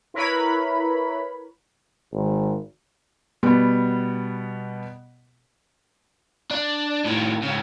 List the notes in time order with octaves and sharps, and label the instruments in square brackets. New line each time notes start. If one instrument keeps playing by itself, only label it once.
[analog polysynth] E4 A#4 B4 C#5 B5
[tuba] G#1
[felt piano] B2 G3 B3
[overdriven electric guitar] D4
A2 D#3
G#2 C#3